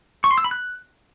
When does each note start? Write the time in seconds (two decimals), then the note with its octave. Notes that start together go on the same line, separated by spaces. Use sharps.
0.24 C#6
0.31 C6
0.38 E6
0.44 B5
0.51 F#6